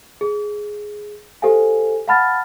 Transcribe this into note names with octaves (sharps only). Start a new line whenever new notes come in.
G#4
G4 A4 C5 F5 G#5
F5 F#5 A5 B5 F6 A6